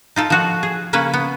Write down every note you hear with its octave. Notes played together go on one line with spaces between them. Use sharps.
D#4 F4 A4
F3 F#4
G#4
C#3 A#3 C#4 B4
B3